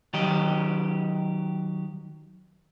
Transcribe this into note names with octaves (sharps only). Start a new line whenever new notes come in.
D#3 F#3 G4 D#5